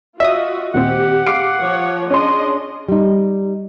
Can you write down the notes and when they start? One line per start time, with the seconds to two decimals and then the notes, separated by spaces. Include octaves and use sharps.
0.20 F4 F#4 D#5 E5 D#6
0.74 D#2 A#2 C4 G4 F#5
1.26 F5 D6 C7 D7
1.60 F3 C#5
2.10 C#4 D4 G#4 D#5 C6
2.88 G3 D#4